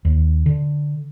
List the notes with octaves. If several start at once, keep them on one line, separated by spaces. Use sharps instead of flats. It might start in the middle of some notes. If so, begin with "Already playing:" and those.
D#2
D3